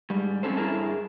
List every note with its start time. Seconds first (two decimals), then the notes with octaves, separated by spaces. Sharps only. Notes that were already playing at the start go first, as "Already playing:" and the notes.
0.10 G#2 G3
0.43 E2 C4 C#4 A4 C5
0.57 G2 G3 E4 G#4 A#4 A5